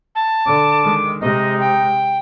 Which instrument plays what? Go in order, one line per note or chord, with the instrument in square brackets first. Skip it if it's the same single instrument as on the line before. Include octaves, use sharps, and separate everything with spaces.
[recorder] A5
[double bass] D3 [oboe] D6
[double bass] D#3 G#3
[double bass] C3 G#3 [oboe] D#4 [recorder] D#5
[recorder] G5